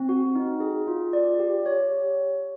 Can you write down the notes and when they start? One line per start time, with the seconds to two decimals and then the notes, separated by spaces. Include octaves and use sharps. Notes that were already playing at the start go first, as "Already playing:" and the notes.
Already playing: C4
0.09 F#4
0.35 D#4
0.60 G#4
0.87 F4
1.13 D5
1.40 G4
1.66 C#5